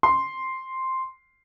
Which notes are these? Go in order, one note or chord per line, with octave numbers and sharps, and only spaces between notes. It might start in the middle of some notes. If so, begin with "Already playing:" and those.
C6